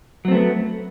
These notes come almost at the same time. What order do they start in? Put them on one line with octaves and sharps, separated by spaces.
F#3 C4 A3 B3